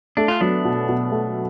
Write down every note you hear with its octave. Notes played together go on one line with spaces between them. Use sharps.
A3 D4
F4
F#3 B3 D4
B2
B2
A3